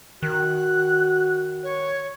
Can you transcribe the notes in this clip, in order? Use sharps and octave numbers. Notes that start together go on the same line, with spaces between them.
D#3 F#4 F#6
C#5